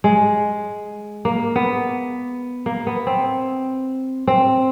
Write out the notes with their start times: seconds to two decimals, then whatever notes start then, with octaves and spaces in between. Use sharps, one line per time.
0.04 G#3
1.25 A#3
1.56 B3
2.66 A#3
2.87 B3
3.07 C4
4.27 C4